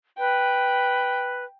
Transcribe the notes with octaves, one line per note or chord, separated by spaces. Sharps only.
B4 G5